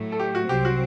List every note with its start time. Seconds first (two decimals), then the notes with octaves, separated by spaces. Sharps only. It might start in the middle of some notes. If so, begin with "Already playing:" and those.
Already playing: A2 F#3 A3
0.12 A4
0.19 G4
0.35 F#4
0.49 C2 C3 F#3 C4 G4
0.65 F#4